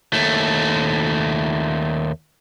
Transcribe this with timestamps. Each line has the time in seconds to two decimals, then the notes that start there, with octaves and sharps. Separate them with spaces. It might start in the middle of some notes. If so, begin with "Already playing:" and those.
0.13 D#2 A3